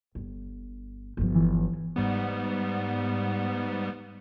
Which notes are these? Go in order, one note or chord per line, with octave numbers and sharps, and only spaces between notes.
G1
G1 F3
E3
G#2 G3 B3